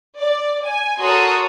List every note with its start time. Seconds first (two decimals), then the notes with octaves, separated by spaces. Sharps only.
0.18 D5
0.64 G#5
1.00 F#4 A4 A#4 C#5 C6 D#6